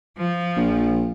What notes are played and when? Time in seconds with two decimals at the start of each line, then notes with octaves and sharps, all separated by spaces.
0.17 F3
0.56 A#1